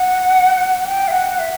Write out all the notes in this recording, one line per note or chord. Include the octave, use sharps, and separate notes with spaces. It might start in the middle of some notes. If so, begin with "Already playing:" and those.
Already playing: F#5
G5
E5
F#5
E5